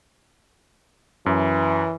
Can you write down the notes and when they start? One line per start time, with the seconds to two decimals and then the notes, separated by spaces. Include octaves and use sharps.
1.26 F#2 E3